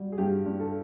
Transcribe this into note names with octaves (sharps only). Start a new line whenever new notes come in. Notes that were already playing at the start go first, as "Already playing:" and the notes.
Already playing: G3 F#4
G#4
G2 G4
G2
A4